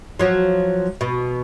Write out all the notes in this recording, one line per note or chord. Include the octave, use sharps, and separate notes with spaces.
F3 F#3
B2